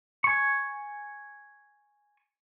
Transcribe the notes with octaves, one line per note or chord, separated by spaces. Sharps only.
G#5 C#6